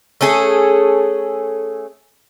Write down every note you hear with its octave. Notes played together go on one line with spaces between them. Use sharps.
A3 C#4 G#4 A4